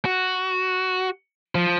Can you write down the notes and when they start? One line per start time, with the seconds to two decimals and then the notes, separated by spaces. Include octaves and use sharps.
0.05 F#4
1.55 F3